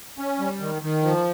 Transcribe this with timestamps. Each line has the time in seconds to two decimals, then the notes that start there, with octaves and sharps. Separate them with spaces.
0.18 C#4
0.40 G3
0.60 D#3
0.82 D#3
1.03 F3